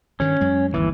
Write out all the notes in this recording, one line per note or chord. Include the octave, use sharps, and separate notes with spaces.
G2 D#3 C#4
F#2 G#3
G1 D#2 E3